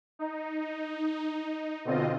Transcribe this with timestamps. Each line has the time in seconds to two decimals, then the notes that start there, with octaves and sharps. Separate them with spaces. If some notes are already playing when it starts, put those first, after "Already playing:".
0.19 D#4
1.85 B2 D3 C4 F4 D#5